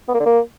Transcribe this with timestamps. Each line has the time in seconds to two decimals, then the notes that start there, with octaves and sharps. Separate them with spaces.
0.08 B3
0.14 A#3
0.20 D3
0.26 A#3